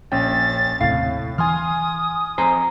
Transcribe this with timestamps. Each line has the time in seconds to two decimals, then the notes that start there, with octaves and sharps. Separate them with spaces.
0.12 A#1 C#4 G5 A6
0.81 D#1 A2 C3 F5
1.38 E3 G#5 C6 D#6 F6
2.38 F2 C5 G#5 A#5